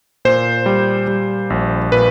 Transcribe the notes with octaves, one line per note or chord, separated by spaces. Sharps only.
A#2 C5
G3
G3
A#1
A#2 B4